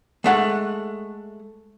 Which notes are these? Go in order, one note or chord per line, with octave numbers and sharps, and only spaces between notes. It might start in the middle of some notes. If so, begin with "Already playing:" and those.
G#3 A3 F#5